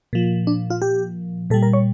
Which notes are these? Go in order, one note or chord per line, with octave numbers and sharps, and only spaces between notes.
A#2 F3
D4
F4
G4
A#2 G3 A4
A#4
C#5